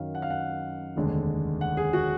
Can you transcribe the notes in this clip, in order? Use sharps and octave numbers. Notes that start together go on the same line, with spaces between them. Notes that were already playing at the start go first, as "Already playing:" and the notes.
Already playing: F#2 D#3 F#3 F5
F#5
F5
F#5
F1 D#2 D3 G#3
F#5
G#4
F#4